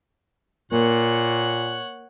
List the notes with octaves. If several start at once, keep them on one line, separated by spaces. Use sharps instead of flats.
A#2 A#3 C#5 F#5